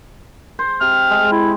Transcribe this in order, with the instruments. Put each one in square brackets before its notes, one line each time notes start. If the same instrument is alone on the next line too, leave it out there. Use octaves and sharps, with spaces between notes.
[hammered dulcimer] C5
[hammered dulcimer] C3 [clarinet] F6
[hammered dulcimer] G#3
[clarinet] E4